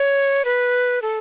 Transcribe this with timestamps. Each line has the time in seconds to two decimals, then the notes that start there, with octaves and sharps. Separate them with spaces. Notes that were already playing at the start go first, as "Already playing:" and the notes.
Already playing: C#5
0.45 B4
1.02 A4